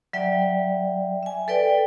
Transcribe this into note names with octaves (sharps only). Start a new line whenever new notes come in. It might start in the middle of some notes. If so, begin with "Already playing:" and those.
F#3 D5 E5 G5
E5 G#5
A4 B4 D5 G5